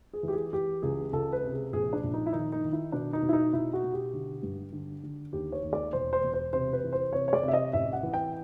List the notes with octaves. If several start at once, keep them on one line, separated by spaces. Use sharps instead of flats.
G#4
E3 G4
G#4
E3 G4
C#2 G#4
C#2 A4
B4
C3
G#4
A#1 G#4
D4
A#1
D#4
E4
D#3 D#4
D#4
D#3
E4
B2 D4
D#4
B2
E4
D#4
B2 E4
F#4
B2
G4
D3
G2
D3
D3
D#2 G4
C#5
D#2
D5
E1 C5
C5
E1
C5
C3 C5
B4
E3
C5
C3 C#5
C#5
D5
C3 E5
D#5
A1 E5
F#5
E3
G5